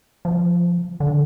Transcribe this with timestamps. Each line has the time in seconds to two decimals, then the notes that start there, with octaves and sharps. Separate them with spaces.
0.25 F3
1.00 D3